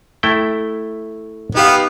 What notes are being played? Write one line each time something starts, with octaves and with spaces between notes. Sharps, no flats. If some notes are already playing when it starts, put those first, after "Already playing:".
A3 E4 G5
B3 D#4 G4 F5